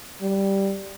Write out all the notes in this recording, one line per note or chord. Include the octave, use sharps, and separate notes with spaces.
G3